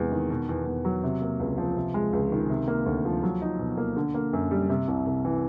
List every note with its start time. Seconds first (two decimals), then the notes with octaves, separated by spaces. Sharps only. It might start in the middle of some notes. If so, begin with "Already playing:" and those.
Already playing: E2 C3 G#3
0.12 D#3
0.30 B2
0.49 E2
0.66 E2
0.85 F#3
1.03 C3
1.21 A#3
1.40 C#2
1.58 F3
1.76 C3
1.94 G#3
2.13 C#2
2.32 D#3
2.50 C3
2.68 A#3
2.86 D2
3.05 F3
3.23 F#3
3.42 D#4
3.59 B2
3.77 A#3
3.97 D3
4.14 A#3
4.33 F#2
4.51 G3
4.70 C3
4.88 C2
5.07 C2
5.25 E3